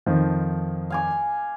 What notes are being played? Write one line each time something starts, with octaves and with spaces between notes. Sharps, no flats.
F2 D#3 F3
F5 G#5 D6